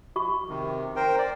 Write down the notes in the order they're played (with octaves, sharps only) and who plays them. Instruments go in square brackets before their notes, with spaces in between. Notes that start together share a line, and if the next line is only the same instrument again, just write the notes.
[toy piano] F#4 C#6
[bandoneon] C3 D#3
A#4 C5 G5
D5